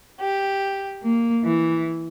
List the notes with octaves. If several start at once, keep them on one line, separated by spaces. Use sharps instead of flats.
G4
A#3
E3